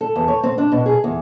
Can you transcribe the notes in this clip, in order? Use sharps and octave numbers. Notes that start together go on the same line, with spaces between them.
A4
E2
C#5
C4
D4
B2
G#4
E2